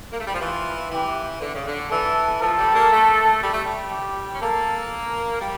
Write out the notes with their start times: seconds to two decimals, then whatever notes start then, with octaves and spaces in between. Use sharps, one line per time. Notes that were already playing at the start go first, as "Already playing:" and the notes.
0.12 A#3
0.19 A3
0.26 G3
0.33 F3
0.40 E3 F4
0.91 E3 G4
1.41 D3
1.54 C#3
1.67 D3
1.91 E3 A4
2.41 F3 A4
2.58 G3
2.74 A#3
2.91 A3
3.42 G3
3.53 A3
3.64 G3
3.91 G4
4.34 C#4
4.41 A#3 A4
5.41 G3